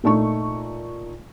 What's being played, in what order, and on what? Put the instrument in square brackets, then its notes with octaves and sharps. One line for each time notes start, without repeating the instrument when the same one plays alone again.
[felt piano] A#2 A3 D#4 C#6